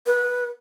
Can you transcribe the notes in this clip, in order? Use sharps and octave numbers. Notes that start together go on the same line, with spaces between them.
B4